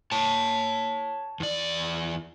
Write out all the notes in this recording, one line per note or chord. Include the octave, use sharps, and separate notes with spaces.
C#5 A5
E2 D5